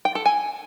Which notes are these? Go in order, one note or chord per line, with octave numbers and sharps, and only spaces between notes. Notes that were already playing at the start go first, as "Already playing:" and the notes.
G5
A4
G#5